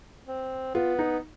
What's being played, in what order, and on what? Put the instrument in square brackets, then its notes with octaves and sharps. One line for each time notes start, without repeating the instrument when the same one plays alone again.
[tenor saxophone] C4
[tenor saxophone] B3 [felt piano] F4
[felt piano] D#4